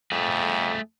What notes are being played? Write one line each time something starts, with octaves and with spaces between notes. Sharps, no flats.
F2 A3 G#4